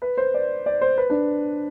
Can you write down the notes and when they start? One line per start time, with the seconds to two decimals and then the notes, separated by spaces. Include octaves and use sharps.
0.02 B4
0.17 C5
0.34 D5
0.66 D5
0.81 C5
0.98 B4
1.10 D4